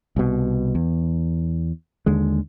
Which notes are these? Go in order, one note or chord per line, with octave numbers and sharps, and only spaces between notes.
C2 B2
E2
D#2 D3 G#3